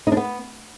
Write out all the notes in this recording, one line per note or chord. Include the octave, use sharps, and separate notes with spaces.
D#4
D4
B3